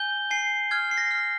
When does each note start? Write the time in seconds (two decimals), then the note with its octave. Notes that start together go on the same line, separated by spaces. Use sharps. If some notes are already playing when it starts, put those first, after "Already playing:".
Already playing: G#5 G6 G7
0.31 G#5 C7
0.71 F6 G#6
0.91 C7
0.97 A#6
1.11 F6